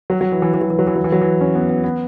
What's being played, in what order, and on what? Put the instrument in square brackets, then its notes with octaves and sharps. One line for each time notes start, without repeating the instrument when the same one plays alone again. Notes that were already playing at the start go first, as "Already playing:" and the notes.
[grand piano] F#3
F#3
E3
E3
E3
F#3
E3
F#3
E3
F#3
E3
F#3
E3
C#4
B3
B3
B3